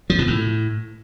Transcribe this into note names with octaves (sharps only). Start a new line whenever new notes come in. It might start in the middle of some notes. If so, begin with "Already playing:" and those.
F3
B2
A2